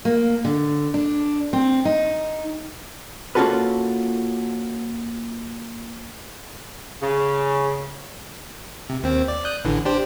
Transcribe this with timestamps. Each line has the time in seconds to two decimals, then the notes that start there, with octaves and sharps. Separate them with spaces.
0.05 A#3
0.45 D3
0.94 D4
1.53 C4
1.85 D#4
3.35 A#3 C#4 F4 F#4 A4 B4
7.03 C#3
8.90 C3
9.03 D#2 C4
9.28 D5
9.45 D#6 F#6 G6
9.65 A1 D3 E3
9.85 D4 G4 C5